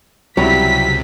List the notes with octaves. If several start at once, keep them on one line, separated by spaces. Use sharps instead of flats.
C#2 C3 F#3 G3 E4 B6